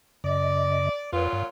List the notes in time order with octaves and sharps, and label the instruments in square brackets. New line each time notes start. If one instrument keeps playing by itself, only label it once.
[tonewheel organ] F#2 C#3 D#5 [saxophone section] D5
[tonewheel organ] F2 B4 [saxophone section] A#2 F#3 F4
[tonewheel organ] G2